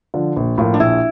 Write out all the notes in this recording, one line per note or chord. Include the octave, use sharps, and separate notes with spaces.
D3 F3
A#1
A2 F3 A#3 F4
D4
A#1 E4